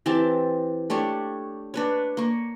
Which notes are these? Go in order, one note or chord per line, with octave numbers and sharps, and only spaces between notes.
E3 C4 G4 A5
A3 D4 G4 C#5
D4 B4 C#5
A#3 C#6